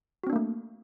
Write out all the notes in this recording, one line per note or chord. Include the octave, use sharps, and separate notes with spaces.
A3 A#3 C4 D4 F#4